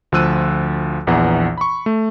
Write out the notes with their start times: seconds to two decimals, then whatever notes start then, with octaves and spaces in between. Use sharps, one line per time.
0.12 D2 F3 F4 E6 F#6 D#7
1.07 A#1 E2 E3 F#5
1.58 B5 C#6
1.86 A3